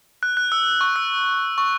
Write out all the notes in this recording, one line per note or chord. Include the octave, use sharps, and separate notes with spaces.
F#6
F#6
E6
C#6
E6
C#6